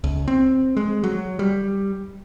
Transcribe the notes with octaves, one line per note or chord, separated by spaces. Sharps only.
C#2
C4
G#3
F#3
G3